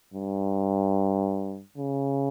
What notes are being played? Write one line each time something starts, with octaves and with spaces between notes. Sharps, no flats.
G2
C#3